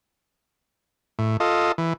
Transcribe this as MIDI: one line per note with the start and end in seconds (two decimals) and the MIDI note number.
1.19 1.37 45
1.40 1.72 65
1.40 1.72 69
1.40 1.72 75
1.78 1.93 52